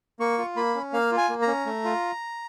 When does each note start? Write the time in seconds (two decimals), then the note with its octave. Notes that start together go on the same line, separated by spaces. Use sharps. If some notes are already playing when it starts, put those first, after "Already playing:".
0.20 A#3 C#6
0.38 F4
0.56 A#3 B5
0.75 C#4
0.93 A#3 F5
1.12 F4
1.18 G#5
1.29 A#3
1.42 A#5
1.47 C#4
1.66 A3
1.84 F4